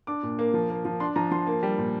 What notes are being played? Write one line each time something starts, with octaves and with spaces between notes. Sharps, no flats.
D4 D6
A#2
A#3
F3
A#3
F3
D4 C6
F3 A#5
F3 C6
A#3
G3
A#2